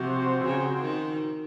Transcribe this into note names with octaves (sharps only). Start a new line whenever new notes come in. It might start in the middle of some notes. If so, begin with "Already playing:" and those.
Already playing: C3 F3 C4 F#4 C5
C#3
D#3